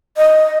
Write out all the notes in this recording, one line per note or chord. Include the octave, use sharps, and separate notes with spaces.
D#5